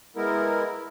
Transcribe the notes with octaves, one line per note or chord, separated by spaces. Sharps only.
G#3 B3 E4 A#4